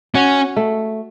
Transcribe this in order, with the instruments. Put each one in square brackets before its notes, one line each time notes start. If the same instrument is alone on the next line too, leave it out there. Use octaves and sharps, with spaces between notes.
[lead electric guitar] C#4 [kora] F#4
[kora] A3